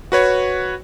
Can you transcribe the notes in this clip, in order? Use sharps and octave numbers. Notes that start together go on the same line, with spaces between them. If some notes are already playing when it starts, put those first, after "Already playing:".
F#4 B4 C#5